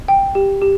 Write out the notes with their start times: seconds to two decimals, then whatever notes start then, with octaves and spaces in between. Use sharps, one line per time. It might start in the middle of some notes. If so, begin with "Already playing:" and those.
0.08 G5
0.35 G4
0.62 G4